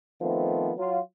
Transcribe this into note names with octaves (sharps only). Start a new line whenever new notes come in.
D#3 F3 A3 B3 C4
F#3 F4